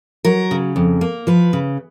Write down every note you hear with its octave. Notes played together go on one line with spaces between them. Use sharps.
F#3 A#4
C#3
F2
A#3
F3 B4
C#3